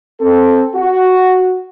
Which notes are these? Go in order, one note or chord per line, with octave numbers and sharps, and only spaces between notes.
C4 A4
F#4